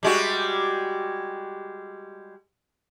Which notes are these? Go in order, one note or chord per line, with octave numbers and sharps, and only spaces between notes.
G3 G#3 F#4